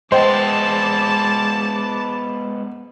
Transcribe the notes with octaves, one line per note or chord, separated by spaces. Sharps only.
G#3 B3 C5 D#5 G5 A5 D6